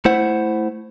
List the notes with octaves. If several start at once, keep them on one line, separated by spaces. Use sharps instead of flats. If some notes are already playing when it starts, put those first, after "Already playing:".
A3 E4 C5 F#5